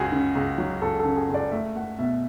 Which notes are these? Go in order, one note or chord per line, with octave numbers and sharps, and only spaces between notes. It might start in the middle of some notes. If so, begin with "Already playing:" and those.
Already playing: C#2 C#3 F#4 G#4
C#3
C#2
F#3
C#2 A4
A4
C#3
G#4
C#2
D5
A3 E5
A3 F#5
B2 E5